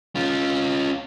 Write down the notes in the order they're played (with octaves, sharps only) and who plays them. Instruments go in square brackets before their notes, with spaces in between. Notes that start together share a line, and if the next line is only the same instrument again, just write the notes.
[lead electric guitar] C#4 F4